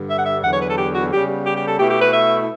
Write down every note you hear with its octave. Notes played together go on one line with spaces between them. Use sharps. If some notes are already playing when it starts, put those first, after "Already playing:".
Already playing: G2 D3 G3
E5
F#5
E5
E2 D3 F#3 B3 F#5
C#5
B4
A4
G4
F#4
C#3 G3 B3 G4
G4
G4
A4
B2 A3 E4 G4
G4
B4
E5